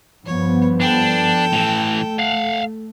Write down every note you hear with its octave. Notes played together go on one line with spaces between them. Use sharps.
G2 F3 B3 C#5
D4 A4 G5
A2 E3 A3
F5 F#5